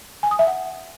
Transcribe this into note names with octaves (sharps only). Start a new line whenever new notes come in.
G#5
D#6
E5
F#5